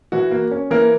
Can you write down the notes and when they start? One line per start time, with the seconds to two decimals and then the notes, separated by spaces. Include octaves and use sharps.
0.12 E3 F#4
0.31 A#3
0.51 C#4
0.71 E3 A#3 A#4